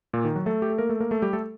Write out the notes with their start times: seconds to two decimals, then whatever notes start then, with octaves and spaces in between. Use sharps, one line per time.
0.13 A#2 A#3
0.24 D#3 D#4
0.35 F#3 F#4
0.46 A3 A4
0.62 G4
0.70 A4
0.78 A#3 A#4
0.89 A3 A4
1.00 A#3 A#4
1.11 A3 A4
1.22 G3 G4
1.33 A3 A4